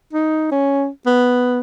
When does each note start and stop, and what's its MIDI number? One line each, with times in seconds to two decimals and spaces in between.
0.13 0.50 63
0.51 0.88 61
1.06 1.61 59